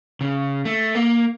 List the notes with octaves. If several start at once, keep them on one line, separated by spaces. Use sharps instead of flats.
C#3
A3
A#3